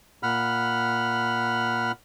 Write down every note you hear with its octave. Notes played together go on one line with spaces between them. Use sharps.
A#2 F#5 B5 F6